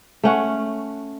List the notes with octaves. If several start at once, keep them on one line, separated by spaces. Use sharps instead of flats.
A3 C#4 F#5